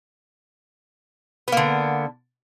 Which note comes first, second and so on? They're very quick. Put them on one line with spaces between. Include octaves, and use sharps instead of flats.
B3 A#3 D3